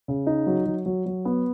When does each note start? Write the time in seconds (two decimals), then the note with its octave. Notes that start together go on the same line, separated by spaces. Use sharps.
0.08 C#3
0.27 D#4
0.47 F#3
0.66 F#3
0.86 F#3
1.06 F#3
1.25 B3